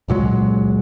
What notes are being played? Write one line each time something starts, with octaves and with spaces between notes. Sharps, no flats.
C#2 A#2 F#3 G#3